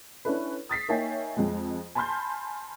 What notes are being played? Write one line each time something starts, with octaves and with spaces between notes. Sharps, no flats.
C#4 D4 E4 A4 B4
D#6 A6 B6 C7
A#3 D#4 C#5 E5 G5 G#5
F2 G#3
G#5 A5 B5 C6 F6 G6